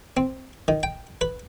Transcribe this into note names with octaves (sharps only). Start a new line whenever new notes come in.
C4
D#3
G5
B4